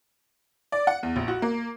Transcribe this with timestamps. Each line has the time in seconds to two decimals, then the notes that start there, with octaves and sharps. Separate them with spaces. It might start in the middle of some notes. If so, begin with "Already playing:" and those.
0.72 D5
0.87 F#5
1.03 E2
1.16 A#1
1.28 F#4
1.42 A#3